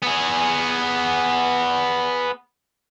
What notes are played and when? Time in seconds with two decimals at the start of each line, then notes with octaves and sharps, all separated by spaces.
0.03 B3 G#4